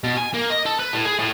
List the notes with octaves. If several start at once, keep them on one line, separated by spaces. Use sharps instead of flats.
B2
G#5
A#3
D#5
A4
B4
A2
G#4
A2